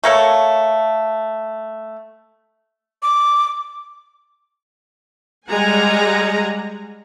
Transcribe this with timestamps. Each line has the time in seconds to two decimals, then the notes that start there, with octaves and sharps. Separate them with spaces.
0.04 A3 A#3 A4 C#5
3.03 D6
5.48 G3 G#3 F#5 G#5 A#5